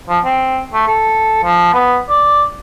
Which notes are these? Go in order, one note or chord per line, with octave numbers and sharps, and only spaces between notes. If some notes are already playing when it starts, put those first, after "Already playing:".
F3
C4
A3
A4
F3
B3
D5